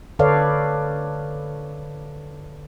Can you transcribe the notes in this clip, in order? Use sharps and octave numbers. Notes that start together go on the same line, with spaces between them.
D3 A4 B4 C#5 D5 F5